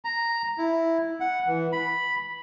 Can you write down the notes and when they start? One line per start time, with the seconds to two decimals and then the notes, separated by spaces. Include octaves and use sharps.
0.05 A#5
0.58 E4
1.20 F#5
1.47 E3
1.72 B5